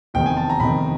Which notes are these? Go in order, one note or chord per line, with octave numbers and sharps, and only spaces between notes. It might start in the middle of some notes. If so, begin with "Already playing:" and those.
F1 E2 C3 D#3 G5
G#5
A5
A#5
F1 E2 C3 D#3 B5